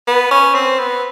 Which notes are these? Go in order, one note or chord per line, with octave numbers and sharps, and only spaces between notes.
B3
C#4
C4
B3